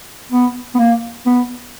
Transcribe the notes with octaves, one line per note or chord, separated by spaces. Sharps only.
B3
B3
A#3
B3